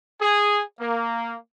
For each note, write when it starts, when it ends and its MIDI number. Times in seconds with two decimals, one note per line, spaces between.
0.21 0.62 68
0.80 1.35 58